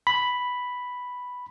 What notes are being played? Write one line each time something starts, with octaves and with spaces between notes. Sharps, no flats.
B5